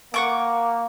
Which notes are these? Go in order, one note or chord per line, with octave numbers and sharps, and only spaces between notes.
A#3 F#5 C#6 D6